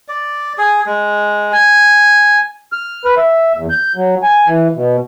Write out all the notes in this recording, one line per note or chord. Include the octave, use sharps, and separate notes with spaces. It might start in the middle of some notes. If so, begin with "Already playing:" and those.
D5
G#4
G#3
G#5
F6
B4
E5
E2
G6
F#3
G#5
E3
B2